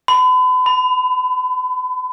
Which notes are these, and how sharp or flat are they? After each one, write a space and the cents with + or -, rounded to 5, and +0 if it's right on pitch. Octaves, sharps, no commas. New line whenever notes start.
B5 +40
B5 +15